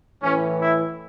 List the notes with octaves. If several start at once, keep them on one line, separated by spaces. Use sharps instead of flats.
A2 E3 C#4
E4